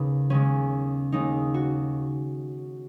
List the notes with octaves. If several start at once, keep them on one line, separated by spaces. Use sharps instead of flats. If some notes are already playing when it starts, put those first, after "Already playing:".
Already playing: D#2 C#3 G#3 B3
D#2 C#3 G#3 C#4
D#2 C#3 G#3 D#4
F#4